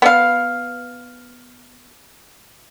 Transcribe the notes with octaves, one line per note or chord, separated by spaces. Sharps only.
B3 F5